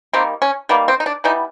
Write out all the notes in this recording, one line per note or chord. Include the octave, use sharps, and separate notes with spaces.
D#3 G3 A#3 C4
C#4
D#3 G3 A#3 B3
C4
D#4
D4
E3 G3 B3 D#4